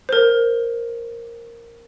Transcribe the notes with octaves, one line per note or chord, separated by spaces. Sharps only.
A#4 C5